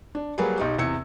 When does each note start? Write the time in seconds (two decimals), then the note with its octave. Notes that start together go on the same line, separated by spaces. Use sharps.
0.15 D4
0.38 F#3 G3 A#3 G#4 B4
0.58 B1 D#4 G4
0.78 E2 C3 E6 G#6 C#7